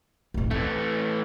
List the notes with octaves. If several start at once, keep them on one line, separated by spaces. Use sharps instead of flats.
D#1 A1
E3 A3 C4